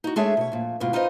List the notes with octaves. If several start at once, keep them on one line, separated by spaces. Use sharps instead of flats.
D#4 F#4
G#3 D4 G#4 A4 C#5 E5
B2 C#5
F2 A#2
D2 G#2 B2 F4
D#4 F4 B4 C5 D#5